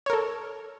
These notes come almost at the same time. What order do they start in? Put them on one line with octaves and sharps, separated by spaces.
C#5 A#4 A4